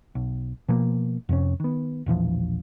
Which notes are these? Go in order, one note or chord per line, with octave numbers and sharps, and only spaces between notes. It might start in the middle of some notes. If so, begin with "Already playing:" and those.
B1
B2 F3 A#3
F2 C3 C#4
D#3 B3
E1 A#1 E3 F3